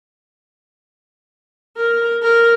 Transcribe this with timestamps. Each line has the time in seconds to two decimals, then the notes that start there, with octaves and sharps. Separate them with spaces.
1.77 A#4
2.23 A#4